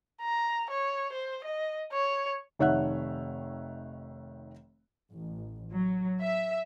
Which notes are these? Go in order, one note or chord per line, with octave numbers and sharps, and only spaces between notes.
A#5
C#5
C5
D#5
C#5
F1 D#3 C#5 E5 F#5 F#6
A1
F#3
E5